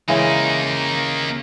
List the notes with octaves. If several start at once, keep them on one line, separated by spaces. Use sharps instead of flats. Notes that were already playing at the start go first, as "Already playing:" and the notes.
C#3 E3 G#3 A#3 D#4